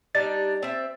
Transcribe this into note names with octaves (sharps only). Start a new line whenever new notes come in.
G3 D4 D#4 A6
C4 E5